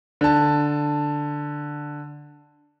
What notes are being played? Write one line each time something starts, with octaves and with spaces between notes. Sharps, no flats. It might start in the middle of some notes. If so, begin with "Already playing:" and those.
D3 A5